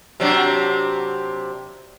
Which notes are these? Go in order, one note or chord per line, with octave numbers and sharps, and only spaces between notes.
C3 F#3 D4